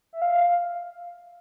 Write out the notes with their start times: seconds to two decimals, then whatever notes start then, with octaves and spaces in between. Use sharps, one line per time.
0.13 E5
0.22 F5